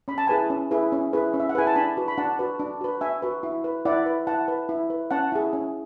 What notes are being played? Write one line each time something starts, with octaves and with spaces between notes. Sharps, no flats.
C#4 B5
A5
E4 G#4 B4 G#5 B5
C#4
E4 G#4 B4
C#4
E4 G#4 B4
C#4
E5
F#5
E4 G#4 B4 G#5
A5
D4 G#5 B5
F#4 B4
B5
D4 F#5 A5
F#4 B4
D4
F#4 B4
D4 E5 G#5
F#4 B4
E4
B4
E4 D5 F#5
B4
E4 F#5 A5
B4
E4
B4
C#4 F#5 A5
E4 G#4
C#4